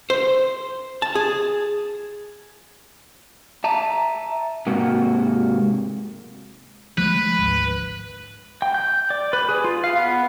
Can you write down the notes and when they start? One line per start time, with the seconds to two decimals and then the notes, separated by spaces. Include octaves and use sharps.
0.10 C5
1.02 A5
1.15 G#4
3.64 E5 A5 A#5
4.67 G#2 C3 A#3 F#4
6.98 F3 G#3 A3 B4
7.39 G#1 D2
8.62 G5
8.74 G6
9.10 D5
9.33 B4
9.49 G#4
9.64 F4
9.84 F5
9.98 B3